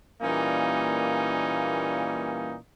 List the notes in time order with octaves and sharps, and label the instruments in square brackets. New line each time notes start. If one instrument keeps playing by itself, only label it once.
[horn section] A#2 E3 G3 A#3 C#4 D#4